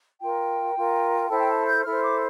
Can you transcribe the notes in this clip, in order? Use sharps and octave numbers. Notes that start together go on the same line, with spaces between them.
F4 A#4 G5
F4 A#4
E4 A4 C5 A5
G5
A5
G6
E4 A4 C5 F6
D6